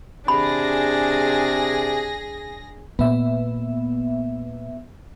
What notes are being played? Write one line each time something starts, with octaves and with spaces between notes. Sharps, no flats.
C3 D4 G#4 B5 A#6
A#2 B3 E5